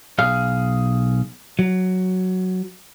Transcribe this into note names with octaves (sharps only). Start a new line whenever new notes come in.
B1 G#4 F5
F#3